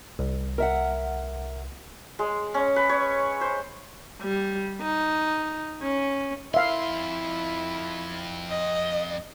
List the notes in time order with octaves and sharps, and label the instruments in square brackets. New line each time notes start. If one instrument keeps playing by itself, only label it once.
[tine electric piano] C2
[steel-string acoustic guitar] A#4 E5 F#5
[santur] G#3
C#4
B4
C#5
C5
[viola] G3
D#4
C#4
[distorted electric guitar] F2 C6 [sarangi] E4 [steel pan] E5 F5
[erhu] D#5